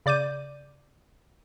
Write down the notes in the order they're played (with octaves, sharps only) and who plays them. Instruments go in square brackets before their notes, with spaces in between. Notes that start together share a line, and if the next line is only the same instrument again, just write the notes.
[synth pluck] C#3 D5 D6 G6 D#7